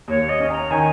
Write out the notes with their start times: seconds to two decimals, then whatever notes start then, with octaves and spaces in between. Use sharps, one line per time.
0.08 D#2 C#5
0.29 D#5
0.40 C#4
0.50 A#5
0.71 D#3 G#5